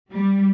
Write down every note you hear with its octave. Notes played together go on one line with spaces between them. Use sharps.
G3